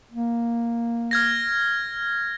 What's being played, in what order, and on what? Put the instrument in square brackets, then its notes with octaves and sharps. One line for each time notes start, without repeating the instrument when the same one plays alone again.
[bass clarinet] A#3
[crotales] F6 G#6 A#6